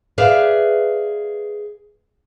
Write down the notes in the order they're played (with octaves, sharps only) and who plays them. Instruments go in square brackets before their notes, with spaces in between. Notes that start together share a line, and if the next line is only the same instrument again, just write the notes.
[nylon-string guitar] G#4 B4 D5 E5 F5